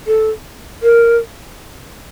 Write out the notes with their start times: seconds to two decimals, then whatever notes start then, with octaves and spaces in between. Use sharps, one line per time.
0.07 A4
0.83 A#4